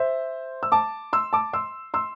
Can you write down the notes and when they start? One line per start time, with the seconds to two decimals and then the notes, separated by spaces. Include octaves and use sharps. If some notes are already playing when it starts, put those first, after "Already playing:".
Already playing: C5 E5
0.63 E6
0.72 A5 D6
1.13 C6 E6
1.33 A5 D6
1.53 C6 E6
1.94 C6 E6